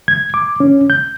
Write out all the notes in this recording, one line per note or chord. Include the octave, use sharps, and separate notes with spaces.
G#6
D6
C#4
G6